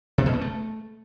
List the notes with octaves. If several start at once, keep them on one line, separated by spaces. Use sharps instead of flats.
C3
B2
B3
A3